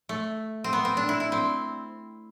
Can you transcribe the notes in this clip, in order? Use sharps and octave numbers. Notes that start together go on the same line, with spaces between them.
A3
C4
B3
C4
D4
E4
E4
C4